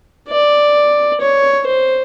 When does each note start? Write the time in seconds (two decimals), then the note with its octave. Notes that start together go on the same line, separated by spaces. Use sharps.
0.29 D5
1.21 C#5
1.67 C5